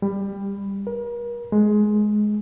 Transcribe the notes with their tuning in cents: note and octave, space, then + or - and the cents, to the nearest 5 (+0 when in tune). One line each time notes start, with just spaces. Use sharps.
G3 +20
A#4 +40
G#3 +15